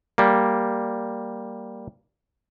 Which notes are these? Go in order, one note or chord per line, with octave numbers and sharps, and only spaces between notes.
G3 A#3